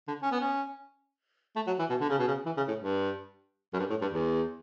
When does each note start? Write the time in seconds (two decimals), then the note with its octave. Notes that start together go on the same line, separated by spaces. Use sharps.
0.08 D3
0.22 C#4
0.31 B3
0.41 C#4
1.56 A3
1.67 F#3
1.79 E3
1.90 B2
2.00 D3
2.09 C#3
2.19 B2
2.28 C#3
2.46 E3
2.57 C#3
2.68 A2
2.79 G2
3.73 F#2
3.79 G2
3.90 A2
4.01 G2
4.12 E2